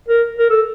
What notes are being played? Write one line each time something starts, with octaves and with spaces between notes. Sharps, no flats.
A#4
A#4
A4